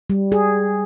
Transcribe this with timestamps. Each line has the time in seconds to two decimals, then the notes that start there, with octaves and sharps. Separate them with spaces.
0.10 G3
0.32 G#4